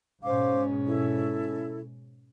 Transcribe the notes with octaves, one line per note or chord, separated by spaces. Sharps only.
G#2 B2 C#4 C5 F5 D6
E4 A4